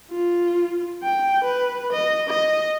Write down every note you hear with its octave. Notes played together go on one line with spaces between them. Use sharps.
F4
G5
B4
D#5
D#5